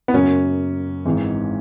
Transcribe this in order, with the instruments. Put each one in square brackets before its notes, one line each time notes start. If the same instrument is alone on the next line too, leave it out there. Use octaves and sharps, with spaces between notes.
[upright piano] B3
[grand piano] F#2 C#3 F#3 A#3 [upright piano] C#4
[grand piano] G#1 G#2 E3